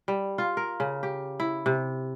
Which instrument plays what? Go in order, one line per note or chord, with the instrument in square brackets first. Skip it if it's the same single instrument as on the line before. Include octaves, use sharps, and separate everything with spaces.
[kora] G3
F4
A#4
C#3
G4
E4
C3